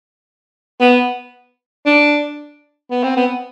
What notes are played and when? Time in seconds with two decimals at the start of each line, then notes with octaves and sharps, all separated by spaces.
0.80 B3
1.86 D4
2.91 B3
3.03 C4
3.16 B3